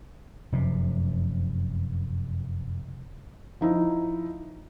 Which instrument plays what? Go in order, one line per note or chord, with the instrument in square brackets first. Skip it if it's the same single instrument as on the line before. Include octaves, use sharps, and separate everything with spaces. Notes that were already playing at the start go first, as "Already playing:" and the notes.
[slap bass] F1 F#2 C3
[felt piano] F3 D#4 E4